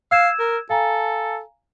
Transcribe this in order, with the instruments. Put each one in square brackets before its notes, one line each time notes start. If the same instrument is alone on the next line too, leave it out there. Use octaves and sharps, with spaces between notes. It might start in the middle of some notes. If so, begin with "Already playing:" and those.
[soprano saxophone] F5 [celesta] E6 G#6 E7
[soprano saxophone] A#4
[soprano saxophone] A4 [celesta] F5 G#5 A#5